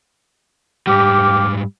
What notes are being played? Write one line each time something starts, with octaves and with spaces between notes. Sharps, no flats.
G#2 G3 G4 F5 D6